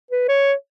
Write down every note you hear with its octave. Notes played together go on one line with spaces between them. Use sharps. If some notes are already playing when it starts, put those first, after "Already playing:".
B4
C#5